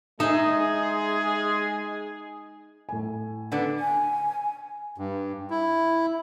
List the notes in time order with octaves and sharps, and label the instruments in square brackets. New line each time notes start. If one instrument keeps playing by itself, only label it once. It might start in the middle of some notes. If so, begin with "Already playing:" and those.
[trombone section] G#3 [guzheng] D#4 [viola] G#4 [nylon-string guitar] D#5 E5
[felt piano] A2 G#5
[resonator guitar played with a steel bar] D3 B3 D4
[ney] G#5
[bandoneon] G2
E4